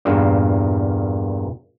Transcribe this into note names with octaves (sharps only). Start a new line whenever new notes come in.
E2 G2 A#2 A#3